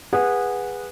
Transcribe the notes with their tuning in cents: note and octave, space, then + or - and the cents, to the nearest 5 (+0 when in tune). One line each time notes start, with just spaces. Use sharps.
G#4 -20 B4 -10 F#5 -15